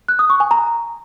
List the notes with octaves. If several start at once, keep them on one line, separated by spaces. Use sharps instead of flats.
F#6
D#6
C#6
G#5
A#5